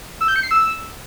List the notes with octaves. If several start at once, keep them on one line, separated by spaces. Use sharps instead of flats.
E6
G6
C#7
C7
E6